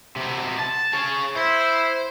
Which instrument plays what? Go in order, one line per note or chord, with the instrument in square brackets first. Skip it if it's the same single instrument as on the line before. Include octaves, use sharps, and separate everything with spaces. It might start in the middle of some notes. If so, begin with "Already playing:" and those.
[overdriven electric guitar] C3 B3
A5
G#4 C#5
[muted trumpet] E4 [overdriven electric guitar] C5